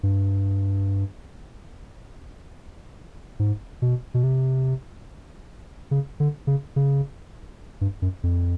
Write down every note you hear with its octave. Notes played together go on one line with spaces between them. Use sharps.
G2
G#2
B2
B2
C3
C#3
D3
C#3
C#3
G2
F#2
F2